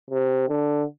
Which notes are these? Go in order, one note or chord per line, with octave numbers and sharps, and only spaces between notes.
C3
D3